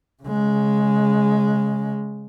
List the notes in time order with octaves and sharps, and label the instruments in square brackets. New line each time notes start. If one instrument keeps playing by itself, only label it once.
[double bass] C#3 G#3